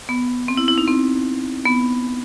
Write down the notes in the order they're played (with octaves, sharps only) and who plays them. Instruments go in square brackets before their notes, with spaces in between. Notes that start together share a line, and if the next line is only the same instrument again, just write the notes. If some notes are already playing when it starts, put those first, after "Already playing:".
[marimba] B3
C4
E4
E4
D#4
C4
B3